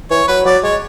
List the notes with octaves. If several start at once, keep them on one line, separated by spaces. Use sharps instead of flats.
E3 C#5
F#3 B4
F#3 D5
G#3 C#5